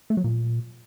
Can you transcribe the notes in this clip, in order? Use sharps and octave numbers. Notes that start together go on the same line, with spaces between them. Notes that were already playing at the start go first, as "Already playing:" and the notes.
A3
F#3
A#2